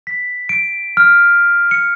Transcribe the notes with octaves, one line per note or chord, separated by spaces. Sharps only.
B6
D7
F6
C#7